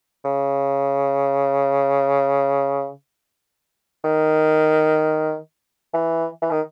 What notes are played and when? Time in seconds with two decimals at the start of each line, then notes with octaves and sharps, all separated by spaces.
0.24 C#3
4.04 D#3
5.94 E3
6.42 E3
6.51 D#3